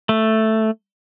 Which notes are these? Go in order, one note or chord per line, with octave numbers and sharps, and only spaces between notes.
A3